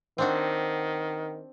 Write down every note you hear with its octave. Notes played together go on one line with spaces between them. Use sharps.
D#3 C4 D4 F#4